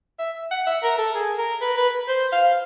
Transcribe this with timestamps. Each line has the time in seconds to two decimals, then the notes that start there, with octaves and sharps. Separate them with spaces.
0.19 E5
0.51 F#5
0.67 E5
0.83 A#4
0.98 A4
1.15 G#4
1.38 A#4
1.61 B4
1.77 B4
2.08 C5
2.32 F5